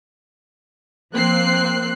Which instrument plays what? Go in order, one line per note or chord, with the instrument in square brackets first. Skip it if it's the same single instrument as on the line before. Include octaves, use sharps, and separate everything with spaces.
[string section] F3 A#3 C4 F#6 C7